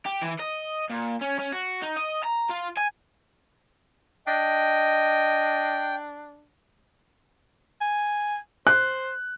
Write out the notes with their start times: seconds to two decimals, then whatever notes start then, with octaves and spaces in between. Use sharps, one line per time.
0.06 G4
0.21 E3
0.40 D#5
0.90 A#2
1.21 C#4
1.39 C#4
1.53 F#4
1.82 D#4
1.97 D#5
2.24 A#5
2.50 F4
2.77 G#5
4.27 D4 D#5 G5
7.81 G#5
8.67 C5 F#6